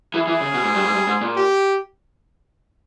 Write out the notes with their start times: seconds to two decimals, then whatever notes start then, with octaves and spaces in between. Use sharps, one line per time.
0.14 E3 G#4
0.27 E3
0.41 C#3
0.54 B2
0.64 G#2
0.74 G2
0.85 G#2
0.94 G2
1.07 G#2
1.21 A#2
1.34 G4